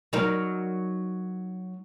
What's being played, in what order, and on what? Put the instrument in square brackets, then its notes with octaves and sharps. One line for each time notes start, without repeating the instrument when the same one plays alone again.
[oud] F#3 D#4 A#4